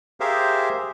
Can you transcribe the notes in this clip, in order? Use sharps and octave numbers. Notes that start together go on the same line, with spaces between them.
G4 G#4 A#4 C5 E5 F5